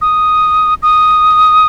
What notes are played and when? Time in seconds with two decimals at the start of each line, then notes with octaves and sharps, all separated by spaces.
0.01 D#6
0.83 D#6